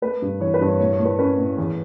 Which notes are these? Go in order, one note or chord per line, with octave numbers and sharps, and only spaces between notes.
A3 B4
G2
E3 C#5
B4
G2
C#5
A2 C#5
C#5
A2
B4
C#4 B4
A2
E2